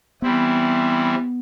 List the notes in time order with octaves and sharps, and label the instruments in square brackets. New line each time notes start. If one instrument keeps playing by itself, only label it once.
[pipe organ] E3 G3 C4 E4 [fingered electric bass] B3